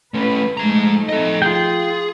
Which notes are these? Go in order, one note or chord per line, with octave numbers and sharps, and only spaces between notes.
A3 C#4 B4
F3 G#3 A3 D#4 A#5
A4 D#5
F4 G#4 G5